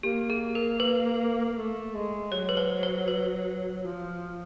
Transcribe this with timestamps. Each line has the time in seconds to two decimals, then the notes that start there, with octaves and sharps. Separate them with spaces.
0.03 A#3 G4
0.30 G#4
0.55 A#4
0.80 B4
1.44 A#3
1.57 A3
1.94 G#3
2.32 F#3 C#5
2.49 B4
2.57 C5
2.83 C5
3.08 B4
3.85 F3